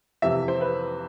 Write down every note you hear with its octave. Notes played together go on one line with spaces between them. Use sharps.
F2 C3 E3 E5
C5
B4